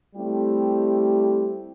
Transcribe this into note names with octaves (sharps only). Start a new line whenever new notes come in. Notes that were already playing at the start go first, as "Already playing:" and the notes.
G3 A3 C4 E4 G4